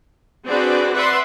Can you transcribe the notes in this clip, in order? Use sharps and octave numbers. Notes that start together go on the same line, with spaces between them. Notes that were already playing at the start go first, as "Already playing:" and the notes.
C4 D4 F#4 G#4 B4 D5
B4 D5 E5 F#5 C6